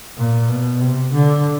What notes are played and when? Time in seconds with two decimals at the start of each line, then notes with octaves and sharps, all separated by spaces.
0.17 A#2
0.49 B2
0.81 C3
1.13 D3